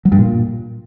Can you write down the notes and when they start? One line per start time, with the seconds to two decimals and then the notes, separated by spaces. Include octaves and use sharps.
0.05 F#3
0.12 G2
0.19 A#2